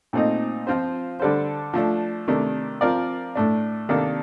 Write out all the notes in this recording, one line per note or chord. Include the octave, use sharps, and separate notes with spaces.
A#2 A3 C4 D#4
F3 C4 F4 C5
D3 G3 D4 A4 C5
F3 A3 D4
C3 D#3 A3 D4
F3 C4 F4 A#4 D5
A2 A3 D4
C3 D#3 A#3 D4 A4